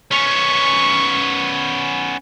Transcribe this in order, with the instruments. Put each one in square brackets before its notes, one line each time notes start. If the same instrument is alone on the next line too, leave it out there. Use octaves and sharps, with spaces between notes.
[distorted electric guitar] B3 C#4 [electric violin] C#6